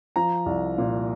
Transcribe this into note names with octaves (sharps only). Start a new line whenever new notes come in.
F3 A#5
C2
A#2